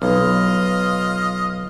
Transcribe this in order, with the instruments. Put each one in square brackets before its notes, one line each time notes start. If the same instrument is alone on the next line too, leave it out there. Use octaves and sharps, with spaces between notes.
[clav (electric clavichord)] B1 [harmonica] F4 D#5 F6